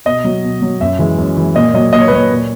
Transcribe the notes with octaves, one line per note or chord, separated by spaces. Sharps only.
B2 D#5
F#3
B2
F#3
F#2 E5
E3 G#3
F#2
E3 G#3
A#2 D#5
F#3 D#5
A#2 D#5
C#5
B4
F#3 C#5
A#2